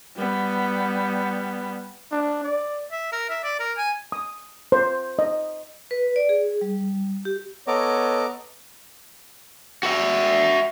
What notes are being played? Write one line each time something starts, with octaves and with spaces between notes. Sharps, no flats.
G3 B3
D4
D5
E5
A#4
E5
D5
A#4
G#5
D#6
C5
D#5
B4
D5
G#4
G3
G4
B3 A4 C#5 D#5 A#5 D6
F#4 E5